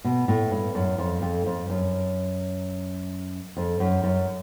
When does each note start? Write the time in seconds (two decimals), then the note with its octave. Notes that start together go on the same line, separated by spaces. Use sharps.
0.04 B2
0.28 A2
0.51 G2
0.75 F#2
0.98 F2
1.22 F2
1.46 F2
1.69 F#2
3.57 F2
3.80 F#2
4.04 F#2